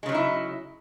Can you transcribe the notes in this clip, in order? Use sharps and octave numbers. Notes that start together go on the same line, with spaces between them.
C#3 F#3 G#3 D#4 E4